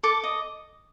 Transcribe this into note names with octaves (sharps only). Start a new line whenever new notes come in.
A4 D6
D#5